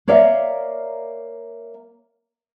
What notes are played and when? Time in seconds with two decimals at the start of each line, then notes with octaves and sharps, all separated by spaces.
0.08 A#3 C#5 D5 E5 F5